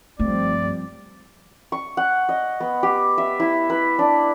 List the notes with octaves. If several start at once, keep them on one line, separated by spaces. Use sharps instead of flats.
G2 F3 G3 A3 C4 D5
C#6
F#5
D#5
B3
G4
E5
E4
B4
D4